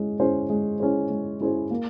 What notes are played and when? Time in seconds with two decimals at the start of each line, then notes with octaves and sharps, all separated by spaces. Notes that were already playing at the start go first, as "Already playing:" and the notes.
Already playing: G#3 C#4 E4
0.20 C#4 E4 G#4 C5
0.50 G#3
0.80 C#4 E4 G#4 C5
1.10 G#3
1.41 C#4 E4 G#4 C5
1.71 A#3